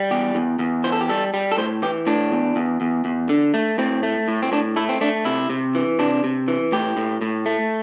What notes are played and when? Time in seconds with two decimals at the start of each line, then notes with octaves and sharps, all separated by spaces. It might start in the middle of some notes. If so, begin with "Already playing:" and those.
Already playing: G3
0.11 E2 G4
0.35 E2
0.59 E2
0.84 E3 C5
0.92 A4
1.01 G4
1.09 G3 A4
1.34 G3
1.52 A4
1.58 A2 C5
1.82 E3 G4
2.07 A2 D4
2.31 E2
2.56 E2
2.81 E2
3.05 E2
3.29 D3
3.54 A3
3.78 A2 C4
4.03 A3
4.28 A2
4.43 C4
4.52 A2 D4
4.76 A3 E4
4.89 C4
5.01 A3 D4
5.25 C3 E4
5.50 C3
5.75 E3
5.99 C3 D4
6.24 C3
6.48 E3
6.72 A2 G4
6.97 A2
7.21 A2
7.46 A3